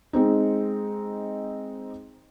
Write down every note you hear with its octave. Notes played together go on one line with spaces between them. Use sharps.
G#3 C4 D#4